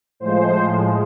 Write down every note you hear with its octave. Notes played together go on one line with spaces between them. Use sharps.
A2 F3 G#3 C5